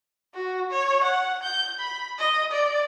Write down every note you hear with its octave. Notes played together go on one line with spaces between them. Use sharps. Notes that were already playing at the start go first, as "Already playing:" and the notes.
F#4
C#5
F#5
G6
B5
D#5
D5